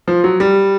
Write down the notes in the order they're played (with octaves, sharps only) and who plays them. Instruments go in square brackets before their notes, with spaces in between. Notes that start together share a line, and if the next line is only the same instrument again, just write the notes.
[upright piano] F3
F#3
G3